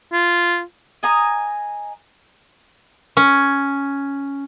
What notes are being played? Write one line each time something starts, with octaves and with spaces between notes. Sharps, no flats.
F4
D#5 G#5 A#5 D#6
C#4